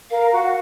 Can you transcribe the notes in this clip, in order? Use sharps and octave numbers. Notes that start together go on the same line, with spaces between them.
A#4 F5
F#4